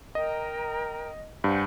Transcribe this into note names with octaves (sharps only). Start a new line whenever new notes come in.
A#4 D#5 G5 A#5
G2 C5 F#5 G#5